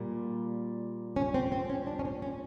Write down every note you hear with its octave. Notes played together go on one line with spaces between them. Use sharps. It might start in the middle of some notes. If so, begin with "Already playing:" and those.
Already playing: A#2 G3 A#3
C#4
C4
C4
C#4
D4
C#4
C4
C#4